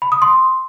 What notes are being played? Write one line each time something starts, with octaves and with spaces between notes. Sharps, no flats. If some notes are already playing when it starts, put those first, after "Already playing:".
B5
D#6
C6